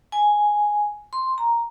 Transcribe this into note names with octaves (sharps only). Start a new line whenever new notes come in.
G#5
C6
A#5